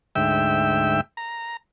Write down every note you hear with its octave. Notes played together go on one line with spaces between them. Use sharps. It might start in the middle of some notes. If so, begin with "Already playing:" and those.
D2 G#2 E5 G5 E6
A#5